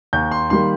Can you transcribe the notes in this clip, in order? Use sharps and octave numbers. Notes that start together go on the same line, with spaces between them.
D#2 G6
C6
D#3 G3 A#3 C6